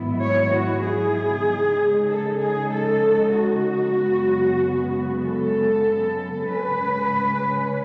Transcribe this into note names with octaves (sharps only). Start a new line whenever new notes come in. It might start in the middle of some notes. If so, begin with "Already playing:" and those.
Already playing: G#2 D#3 F#3 B3 E4
C#5
F#4
G#4
C#3 G#3 D#4
A4
G#4
A4
F#4
F#2 C#3 G#3 B3
A4
C#3 G#3 C#4 B4